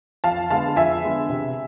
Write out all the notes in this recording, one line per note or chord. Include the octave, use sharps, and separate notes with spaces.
F2 F5 A5
D3 G#3 B3 F5 A5
F2 E5 G#5
D3 G#3 B3
C3